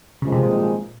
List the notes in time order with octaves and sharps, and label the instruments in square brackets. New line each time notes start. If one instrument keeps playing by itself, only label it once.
[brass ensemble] G#1 G2 F3 G#3 D#4 [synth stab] C#3
[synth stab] C3
A#2